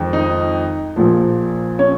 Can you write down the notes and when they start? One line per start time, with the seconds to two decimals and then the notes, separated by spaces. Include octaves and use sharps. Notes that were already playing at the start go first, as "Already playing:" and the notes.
Already playing: F2 D#3 G#3
0.13 D#4 D#5
0.96 A#1 A#2 F3
1.79 C#4 C#5